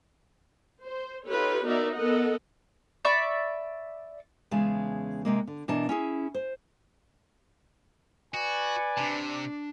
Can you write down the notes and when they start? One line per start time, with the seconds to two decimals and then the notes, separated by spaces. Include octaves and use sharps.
0.83 C5
1.28 D#4 F4 G4 A4 B4 C#5
1.65 B3 D#4 F#4 A#4 D5 E5
1.95 B3 A4 A#4 D#5 F#5
3.05 D5 E5 B5 C#6
4.51 E2 C#3 G#3 A5
5.25 C3 G#3 A#3
5.47 D3
5.68 B2 E3 D4 A#4 A5
5.89 C#4 E4 G#4
6.34 C5
8.34 F#4 B4 D5 G#5
8.97 C3 D4 A5